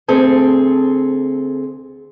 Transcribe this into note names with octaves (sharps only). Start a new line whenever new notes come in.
D2 C4 G#4 A4